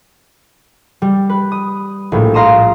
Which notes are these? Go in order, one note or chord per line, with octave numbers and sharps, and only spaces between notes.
G3
B4
D#6
A#1 A2
F5 A#5 C6 D#6 E7